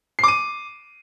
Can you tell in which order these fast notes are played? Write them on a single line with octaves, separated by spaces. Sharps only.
C7 D6 D#7